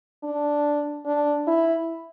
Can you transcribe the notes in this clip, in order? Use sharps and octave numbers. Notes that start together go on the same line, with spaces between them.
D4
D4
E4